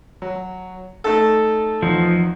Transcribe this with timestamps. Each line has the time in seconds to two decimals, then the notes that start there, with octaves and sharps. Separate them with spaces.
0.22 F#3
1.04 A3 D#4 A4
1.82 E2 F3 D#4